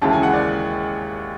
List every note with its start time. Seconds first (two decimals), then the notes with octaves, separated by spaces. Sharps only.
0.02 D#2 C#3 E3 G#3 A5
0.13 G#5
0.23 F#5
0.34 D5